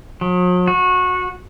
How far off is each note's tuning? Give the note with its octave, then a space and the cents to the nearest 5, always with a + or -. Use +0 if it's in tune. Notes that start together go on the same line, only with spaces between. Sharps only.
F#3 -45
F#4 -20